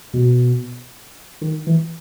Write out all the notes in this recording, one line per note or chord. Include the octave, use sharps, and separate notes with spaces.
B2
D#3
E3